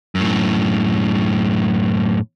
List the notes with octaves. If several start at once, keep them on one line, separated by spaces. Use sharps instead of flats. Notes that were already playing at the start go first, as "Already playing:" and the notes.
F#2 A2